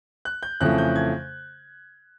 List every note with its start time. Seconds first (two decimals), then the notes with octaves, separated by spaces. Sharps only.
0.25 F#6
0.43 G6
0.61 F2 C#3 E3 A3 F#6
0.78 G6
0.96 G#6